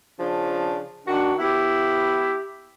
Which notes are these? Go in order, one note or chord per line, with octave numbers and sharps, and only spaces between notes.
C#3 F3 D4
D#3 D4 F#4
B3 E4 G4